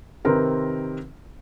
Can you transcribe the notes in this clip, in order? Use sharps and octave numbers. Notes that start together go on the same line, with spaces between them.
C3 D#3 C4 A#4 B4